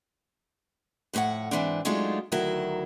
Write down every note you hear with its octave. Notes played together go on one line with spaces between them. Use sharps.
F2 A2 F4 C#5 F#5
G#2 E3 C4 D4
F#3 G#3 A3 D4 D#4 F4
D2 D#3 F#3 E4 A#4